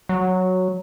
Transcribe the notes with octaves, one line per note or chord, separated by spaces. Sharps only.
F#3